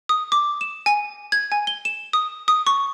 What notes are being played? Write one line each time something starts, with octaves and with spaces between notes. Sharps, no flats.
D#6
D6
E7
G#5
G#6
G#5
G7
E7
D#6
D#6
C#6